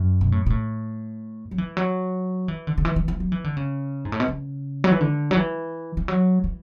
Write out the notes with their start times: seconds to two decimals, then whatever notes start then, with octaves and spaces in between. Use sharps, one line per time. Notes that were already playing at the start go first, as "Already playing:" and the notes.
Already playing: F#2
0.21 B2
0.32 A2
0.46 B2
0.50 A2
1.51 F#3
1.58 E3
1.77 F#3
2.48 E3
2.67 D3
2.78 D3
2.85 E3
2.96 E3
3.08 E3
3.20 F#3
3.32 E3
3.44 D3
3.57 C#3
4.05 G#2
4.12 A2
4.20 B2
4.28 C#3
4.84 F#3
4.92 E3
5.01 D3
5.31 F#3
5.36 E3
5.97 E3
6.08 F#3
6.44 E3